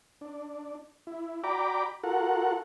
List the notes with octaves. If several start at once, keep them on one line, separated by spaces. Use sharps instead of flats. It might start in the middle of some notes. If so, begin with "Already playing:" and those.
D4
E4
F#4 D5 G5 A#5 B5 D6
F4 F#4 A4 A#4 F#5